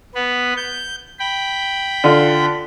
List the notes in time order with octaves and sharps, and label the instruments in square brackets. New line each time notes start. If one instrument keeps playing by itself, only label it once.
[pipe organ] B3 B4
G6
G5 B5
[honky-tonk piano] D3 F4